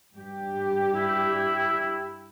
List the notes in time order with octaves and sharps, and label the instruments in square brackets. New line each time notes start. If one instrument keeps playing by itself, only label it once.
[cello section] G2 G4
[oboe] E4